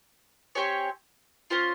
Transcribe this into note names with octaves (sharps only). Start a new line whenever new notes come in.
C4 G4 C#5 G#5
C#4 F4 C5